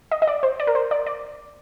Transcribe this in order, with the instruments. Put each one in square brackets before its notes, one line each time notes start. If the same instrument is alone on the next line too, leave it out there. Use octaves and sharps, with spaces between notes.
[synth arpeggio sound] D#5
D#5
D5
C5
D5
A#4
C5
D5
D5